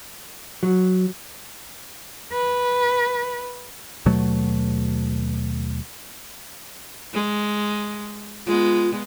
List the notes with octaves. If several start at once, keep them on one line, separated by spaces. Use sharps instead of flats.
F#3
B4
D#2 B2 F#3 A3
G#3
G#3 B3 F4